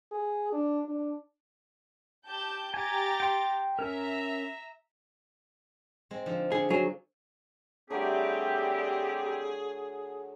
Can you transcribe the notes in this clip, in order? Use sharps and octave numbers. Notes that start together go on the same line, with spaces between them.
G#4
D4
D4
G4 A5 G6
G4 G#5 A#5 A6
G5 C6
C#4 A#4 E5 A#5
G#3 C4
D3 F3
D3 G#4
F#3 G#4
D3 F#3 G3 A3 C4 G4 G#4